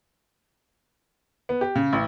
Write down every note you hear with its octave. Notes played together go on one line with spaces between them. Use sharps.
B3
G4
C#3
A1